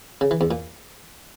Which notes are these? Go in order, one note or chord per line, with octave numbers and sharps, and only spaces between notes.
C#3
E3
E2
A#2